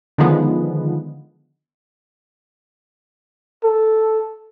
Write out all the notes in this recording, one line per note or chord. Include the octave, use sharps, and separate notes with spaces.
D3 D#3 F3 G#3 B3
A4